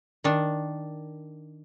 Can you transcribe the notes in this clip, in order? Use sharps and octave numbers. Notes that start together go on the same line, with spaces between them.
D#3 D4